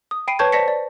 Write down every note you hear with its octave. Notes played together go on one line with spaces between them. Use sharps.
D#6
G5 B5 C7 D7 D#7
B4 C#5 A5 C#6 G6 G#6
C5 D5 A5 A#6 B6 C#7
D5